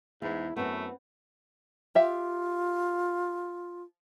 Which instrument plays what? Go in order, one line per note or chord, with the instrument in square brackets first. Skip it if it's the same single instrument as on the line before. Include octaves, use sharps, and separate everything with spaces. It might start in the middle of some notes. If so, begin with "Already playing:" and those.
[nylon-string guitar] E2 [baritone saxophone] G#2 [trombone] E4
[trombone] F#2 [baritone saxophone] A3 [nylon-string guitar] B3 C4
[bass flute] F4 [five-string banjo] G4 E5 F5